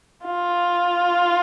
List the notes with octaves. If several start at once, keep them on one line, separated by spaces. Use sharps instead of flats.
F4